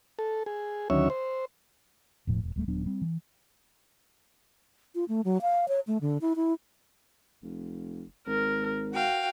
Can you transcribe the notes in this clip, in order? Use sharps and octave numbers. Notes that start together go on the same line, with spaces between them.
A4
G#4
D2 D#3 F#3 C#4 C#5 E5
C5
E1 A2 F3
E1
D1 G3 A3
D#1 F#3 B3 D4
G3 C4
E3
F4
A3
F#3
F5
C#5
A3
D3
E4
E4
F1
G#1 A#4
F#4 F5 G5